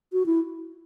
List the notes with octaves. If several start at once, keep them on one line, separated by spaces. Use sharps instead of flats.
F#4
E4